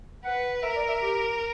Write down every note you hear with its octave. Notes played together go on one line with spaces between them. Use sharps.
B4 F#5
A#4 E5
D5
E5
G4